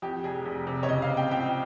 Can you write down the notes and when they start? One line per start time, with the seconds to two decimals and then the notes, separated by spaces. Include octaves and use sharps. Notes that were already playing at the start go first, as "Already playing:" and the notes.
0.02 F2 G4
0.24 F1 G#4
0.45 F1
0.67 C3
0.83 C#5
0.89 C#3 D#5
1.02 F5
1.09 C4
1.17 G5
1.31 C#2 G5